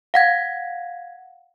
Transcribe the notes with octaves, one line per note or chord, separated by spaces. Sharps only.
F5 F#5 G#6